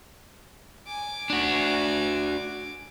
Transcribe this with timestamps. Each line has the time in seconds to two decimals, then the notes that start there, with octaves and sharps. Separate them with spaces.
0.87 G#5 D6
1.30 D4 F#4